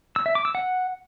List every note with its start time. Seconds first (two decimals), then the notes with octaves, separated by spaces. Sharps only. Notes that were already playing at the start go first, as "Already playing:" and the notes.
0.16 E6
0.26 E5
0.35 D6
0.45 E6
0.55 F#5